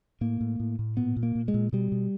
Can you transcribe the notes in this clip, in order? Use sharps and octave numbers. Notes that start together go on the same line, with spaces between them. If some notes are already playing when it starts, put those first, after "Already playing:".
A2 A#3
A2
A2
A2
A#2 B3
A#2
A#3
A#2
G#3
A#2
B2 G3
B2